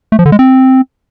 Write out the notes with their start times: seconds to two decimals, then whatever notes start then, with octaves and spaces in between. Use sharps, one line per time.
0.12 A3
0.19 F3
0.26 D3
0.32 G#3
0.39 C4